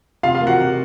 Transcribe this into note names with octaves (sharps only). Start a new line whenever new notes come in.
C3 F4 F5
F4 F5
A#3
F#4 F#5
C3